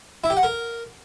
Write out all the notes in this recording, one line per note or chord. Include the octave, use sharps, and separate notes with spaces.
E4
G4
F#5
A#4